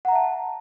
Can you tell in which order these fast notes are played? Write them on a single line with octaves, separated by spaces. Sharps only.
F#5 A#5 E5 A5